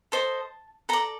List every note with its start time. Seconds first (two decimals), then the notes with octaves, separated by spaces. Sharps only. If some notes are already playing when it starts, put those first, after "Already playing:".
0.12 A4 C5 D#5 A5
0.89 A4 D5 A#5